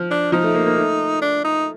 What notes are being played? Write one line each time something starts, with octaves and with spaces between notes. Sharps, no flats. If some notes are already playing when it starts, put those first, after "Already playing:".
Already playing: F3
D4
F3 D#4
A3
A#3
A#3
A3
D4
D#4